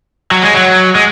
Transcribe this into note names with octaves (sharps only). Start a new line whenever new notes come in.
F#3
G#3
F#3
G#3